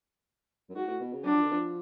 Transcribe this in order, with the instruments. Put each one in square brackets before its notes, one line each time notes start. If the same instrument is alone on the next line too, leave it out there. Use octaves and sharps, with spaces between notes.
[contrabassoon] F#2
[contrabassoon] G#2 [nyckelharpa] F#4
[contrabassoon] A2
B2
C#3
[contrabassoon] F#3 [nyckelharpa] D4
[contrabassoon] F3
D3
F3